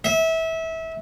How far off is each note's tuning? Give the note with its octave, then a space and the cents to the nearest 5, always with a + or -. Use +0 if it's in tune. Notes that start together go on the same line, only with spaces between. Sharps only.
E5 -25